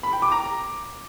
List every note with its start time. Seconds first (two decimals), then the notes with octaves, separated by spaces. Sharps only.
0.03 B5
0.13 G5
0.22 D6
0.32 A#5